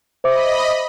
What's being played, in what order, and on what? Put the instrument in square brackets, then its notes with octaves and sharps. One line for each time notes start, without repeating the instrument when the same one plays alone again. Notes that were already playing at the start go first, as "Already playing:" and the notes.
[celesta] C5 E5 D6 [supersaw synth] D#5 B5